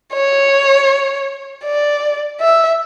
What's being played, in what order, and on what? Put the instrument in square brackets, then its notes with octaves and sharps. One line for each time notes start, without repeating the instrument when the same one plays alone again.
[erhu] C#5
D5
E5